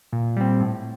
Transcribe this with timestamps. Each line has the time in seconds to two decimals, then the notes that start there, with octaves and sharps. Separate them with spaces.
0.13 A#2
0.37 G3 C4
0.60 A2